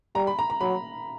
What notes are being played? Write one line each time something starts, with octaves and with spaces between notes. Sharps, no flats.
G3 A#5
B5
A#5
A#5
F#3 B5